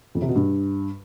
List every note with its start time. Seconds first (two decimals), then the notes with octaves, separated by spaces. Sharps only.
0.15 F2
0.22 C3
0.29 B2
0.36 G2